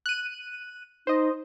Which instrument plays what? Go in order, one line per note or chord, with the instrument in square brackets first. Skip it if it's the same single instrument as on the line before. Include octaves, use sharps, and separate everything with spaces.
[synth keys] F#6 D#7
[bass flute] D#4 [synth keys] C5 D#5